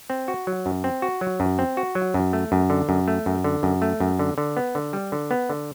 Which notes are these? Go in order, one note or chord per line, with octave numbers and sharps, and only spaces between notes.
C4
F#4
F#3
F#2
C4
F#4
F#3
F#2
C4
F#4
F#3
F#2
A3
F#2
D3
F#2
A3
F#2
D3
F#2
A3
F#2
D3
D3
B3
D3
G3
D3
B3
D3